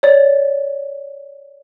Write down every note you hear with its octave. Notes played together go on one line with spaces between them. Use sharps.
C#5 D5